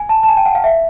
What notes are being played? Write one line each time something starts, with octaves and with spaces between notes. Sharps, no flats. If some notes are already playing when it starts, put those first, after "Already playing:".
Already playing: G#5
A5
A5
G#5
G5
F#5
F5
E5